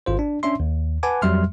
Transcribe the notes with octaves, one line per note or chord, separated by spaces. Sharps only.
G#1 F4 C5
D4
C#4 D4 E5 C6
D#2
B4 F#5 G#5 A5 D6
F2 F#3 G3 E5 C6 F6